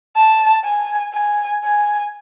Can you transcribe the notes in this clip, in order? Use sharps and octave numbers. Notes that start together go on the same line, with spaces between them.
A5
G#5
G#5
G#5